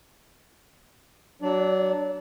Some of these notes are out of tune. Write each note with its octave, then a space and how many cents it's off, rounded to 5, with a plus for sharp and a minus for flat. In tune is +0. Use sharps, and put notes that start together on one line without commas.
F#3 +20 D4 +5 D5 -25